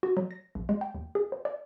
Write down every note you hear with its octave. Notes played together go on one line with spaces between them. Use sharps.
F#4
F#3
A#6
A#1
G#3
G5
D#2
G#4
C5
D5